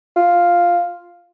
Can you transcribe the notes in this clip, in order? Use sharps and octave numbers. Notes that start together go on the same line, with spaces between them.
F4